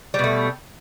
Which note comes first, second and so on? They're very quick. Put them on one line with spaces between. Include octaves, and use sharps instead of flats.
G3 B2 A3